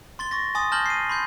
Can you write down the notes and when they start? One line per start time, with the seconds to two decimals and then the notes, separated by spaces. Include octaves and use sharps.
0.19 C6 A6 G7
0.31 C#6 A6 A#6
0.55 G#5 C6 D#6 A6
0.72 A5 F6 G6 A#6 F#7 G7
0.86 C7 D#7
1.09 B5 C6 G6